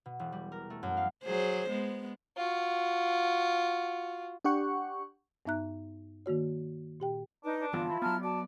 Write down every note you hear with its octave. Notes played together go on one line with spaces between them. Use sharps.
B2
E1
G3
A#4
A3
F#2
F5
F#3 G#4 C5
G#3 B3
F4 F#4
D4 G4 F#5 C#6
G2 B3 D#4 E5 A#5 F#6
D#3 A#3 F#4 C#5
A#2 G4 G5
D4 D#4 B4
D4
G1 E3 B3 F4 A5
E3 E4
F#3 B3 A5 A#5 F6
F#4 D5 A5